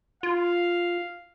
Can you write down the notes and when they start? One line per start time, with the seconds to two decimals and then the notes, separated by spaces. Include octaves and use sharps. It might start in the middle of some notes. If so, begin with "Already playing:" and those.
0.23 F4 F5